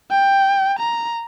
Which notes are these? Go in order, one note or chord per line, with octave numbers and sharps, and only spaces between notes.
G5
A#5